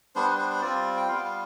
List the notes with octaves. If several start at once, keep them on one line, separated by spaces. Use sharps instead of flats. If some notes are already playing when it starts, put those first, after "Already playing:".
G3 B3 D4 C5
B4
C5
C5
G3 C4 F4 D5
G5
G3 B3 F4 F5
F5